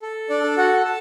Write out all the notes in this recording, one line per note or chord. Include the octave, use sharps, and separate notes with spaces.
A4
D4 D5
A4
F#4 F#5
A4 A5